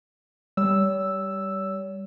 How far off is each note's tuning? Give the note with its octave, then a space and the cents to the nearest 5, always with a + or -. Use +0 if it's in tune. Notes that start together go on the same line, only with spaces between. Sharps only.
G3 +0 C#5 +40 E6 +0